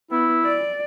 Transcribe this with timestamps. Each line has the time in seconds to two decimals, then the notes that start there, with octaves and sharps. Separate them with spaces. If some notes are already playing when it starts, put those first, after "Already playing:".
0.11 B3 E4
0.45 D5